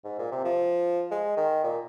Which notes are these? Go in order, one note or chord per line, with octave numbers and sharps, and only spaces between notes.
G#2
A#2
C3
F3
G#3
D#3
A#2